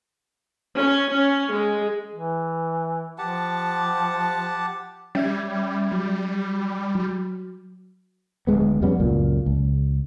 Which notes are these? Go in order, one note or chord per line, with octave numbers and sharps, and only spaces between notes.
C#4
C#4
G#3
E3
F3 G4 F#5 A5
G3 C#4 E5 G#6
F#3
F#3
D1 G#1 G#3 B3
F2 G3 B3 C#4
C#2 F#2 A#2
C#2